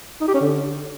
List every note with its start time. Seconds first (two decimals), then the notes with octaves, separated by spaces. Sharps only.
0.21 D#4
0.27 G4
0.34 C#4
0.41 D3